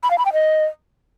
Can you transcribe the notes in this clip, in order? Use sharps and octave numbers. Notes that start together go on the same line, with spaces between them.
B5
F5
B5
G5
D#5